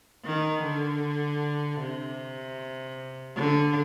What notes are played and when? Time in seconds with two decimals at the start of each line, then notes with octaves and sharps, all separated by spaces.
0.25 D#3
0.63 D3
1.80 C3
3.36 D3